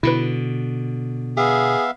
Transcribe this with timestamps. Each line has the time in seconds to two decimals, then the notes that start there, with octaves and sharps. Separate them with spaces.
0.03 B2 D3 E4 B4
1.37 B3 G#4 E5 F5